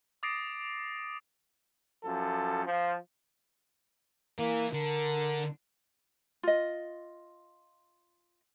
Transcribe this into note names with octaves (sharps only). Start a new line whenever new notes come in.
D6 D#6 A6 A#6 C7 D7
F#2 F3 A4
F3
E3 A#3
D3 A#4
F4 D#5